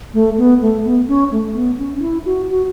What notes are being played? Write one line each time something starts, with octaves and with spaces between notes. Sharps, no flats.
A3
B3
A3
B3
C#4
A3
B3
C#4
C#4
E4
F#4
F#4